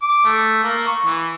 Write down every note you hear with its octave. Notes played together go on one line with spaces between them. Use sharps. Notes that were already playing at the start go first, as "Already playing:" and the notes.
D6
A3
A#3
C#6
E3